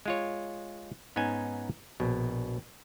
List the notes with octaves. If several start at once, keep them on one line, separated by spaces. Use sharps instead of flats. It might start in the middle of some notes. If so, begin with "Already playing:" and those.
G#3 F4 C#5
G#2 B3 C#4 D#4 G#5
A#1 B2